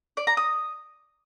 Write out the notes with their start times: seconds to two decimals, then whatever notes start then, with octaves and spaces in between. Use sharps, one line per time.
0.17 D5
0.27 A#5
0.37 D#6